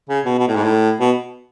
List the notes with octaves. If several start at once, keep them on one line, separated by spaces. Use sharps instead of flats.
C#3
B2
B2
A2
G#2
A2
B2